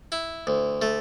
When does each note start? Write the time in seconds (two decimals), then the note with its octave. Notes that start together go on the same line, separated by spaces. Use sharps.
0.12 E4
0.47 D2
0.82 A3